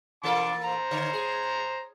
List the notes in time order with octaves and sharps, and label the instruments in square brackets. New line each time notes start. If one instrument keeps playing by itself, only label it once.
[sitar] E3 A#3 A4 [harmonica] A5 C6 D6
[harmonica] C5 A#5
[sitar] D3 C#5
G#4